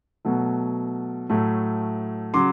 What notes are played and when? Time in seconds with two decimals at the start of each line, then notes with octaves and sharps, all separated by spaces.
0.25 B2 F#3 A3
1.29 A2 F#3 A3
2.34 C#3 F#3 C6 D6